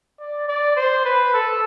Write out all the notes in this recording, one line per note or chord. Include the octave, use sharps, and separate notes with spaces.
D5
D5
C5
B4
A4